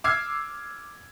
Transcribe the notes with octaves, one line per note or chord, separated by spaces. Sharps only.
D6 E6 F6 G#6 C7